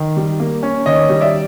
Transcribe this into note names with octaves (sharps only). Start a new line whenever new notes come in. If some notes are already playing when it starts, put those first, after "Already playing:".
Already playing: D#3
G3
A#3
C#4
D#3 C#5 D#5
G3
D5 E5